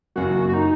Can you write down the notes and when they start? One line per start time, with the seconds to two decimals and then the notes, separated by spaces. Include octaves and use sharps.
0.16 F#1 F#2 F#3 A#3 F#4
0.49 F#4
0.54 D#4